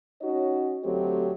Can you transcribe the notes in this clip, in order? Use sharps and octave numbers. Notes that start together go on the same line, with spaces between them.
C#4 D#4 F#4 C#5 D#5
D2 F#3 A3 C4 G4